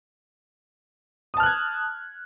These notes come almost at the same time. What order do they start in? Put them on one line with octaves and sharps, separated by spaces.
D#6 A5 F6 F#6 G#6